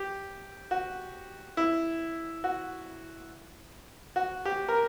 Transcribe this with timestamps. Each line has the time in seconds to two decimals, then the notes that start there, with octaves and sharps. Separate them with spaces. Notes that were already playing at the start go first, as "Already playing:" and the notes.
Already playing: G4
0.71 F#4
1.57 E4
2.44 F#4
4.16 F#4
4.45 G4
4.68 A#4